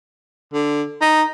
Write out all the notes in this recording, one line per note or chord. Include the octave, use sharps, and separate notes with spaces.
D3
D#4